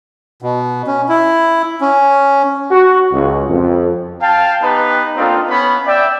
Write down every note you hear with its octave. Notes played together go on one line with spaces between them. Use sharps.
B2
C#4
E4
C#4
F#4
C#2
F2
F5 G5 A5
B3 D#4 G4 B4
A#3 C4 D4 D#4 F4 A4
B3 C#4 B4 B5
D5 E5 G5